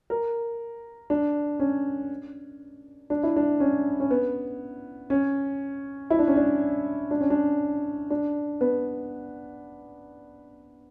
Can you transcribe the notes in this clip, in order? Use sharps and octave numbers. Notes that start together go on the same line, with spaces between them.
A#4
D4
C#4
D4
E4
D4
C#4
C#4
B3
C#4
E4
D4
C#4
D4
D4
C#4
D4
D4
B3